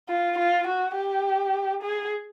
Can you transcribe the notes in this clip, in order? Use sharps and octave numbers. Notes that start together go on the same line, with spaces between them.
F4
F4
F#4
G4
G#4